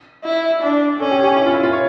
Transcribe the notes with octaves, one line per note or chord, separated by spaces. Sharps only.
E4
D4
C#4 A4
G4
G4
E4
F4
E4
F4
C#5